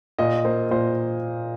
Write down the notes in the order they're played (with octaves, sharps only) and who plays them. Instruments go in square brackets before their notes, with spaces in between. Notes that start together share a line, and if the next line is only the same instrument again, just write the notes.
[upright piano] A#2 [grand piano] D#5
[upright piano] A#3 [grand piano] C5
[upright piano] A#2 [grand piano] C5